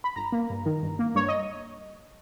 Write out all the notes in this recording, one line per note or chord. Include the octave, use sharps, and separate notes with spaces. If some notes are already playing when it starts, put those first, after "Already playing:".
B5
G1 A#5
A#3
G2
D#3
G1
A#3
G2 C#5
D#5